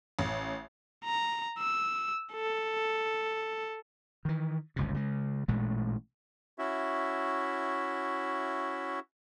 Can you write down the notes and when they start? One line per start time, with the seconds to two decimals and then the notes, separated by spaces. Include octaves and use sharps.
0.19 A1
1.05 A#5
1.59 E6
2.33 A4
4.25 D#3 E3
4.76 G1 C#2 C3
4.94 C#3 G#3
5.48 A1 A#2 G#3 A3
6.58 C#4 E4 F#4 E5